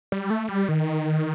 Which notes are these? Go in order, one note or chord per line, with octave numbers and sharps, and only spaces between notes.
G3
A3
G3
D#3